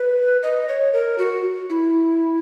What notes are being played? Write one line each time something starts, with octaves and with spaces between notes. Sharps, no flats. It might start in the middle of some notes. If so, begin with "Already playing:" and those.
Already playing: B4
D#5
C#5
A#4
F#4
E4